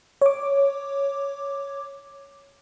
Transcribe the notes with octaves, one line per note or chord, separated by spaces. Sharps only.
C#5 D6